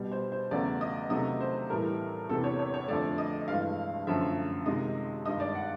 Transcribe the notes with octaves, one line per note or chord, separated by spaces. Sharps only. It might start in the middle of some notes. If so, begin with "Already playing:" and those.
Already playing: B2 G3
C5
C5
E2 C#3 F#3 A3 D5
D#5
C3 D#3 F#3 A3 D#5
C5
A2 E3 G3 A#4
E2 C3 E3 A4
C#5
C#5
C#5
F2 D3 F3 A3 D5
D#5
G2 E3 G#3 F5
F#2 D3 F3 A3 E5
C3 D#3 G#3 D#5
G2 D#3 G#3 D#5
D5
F#5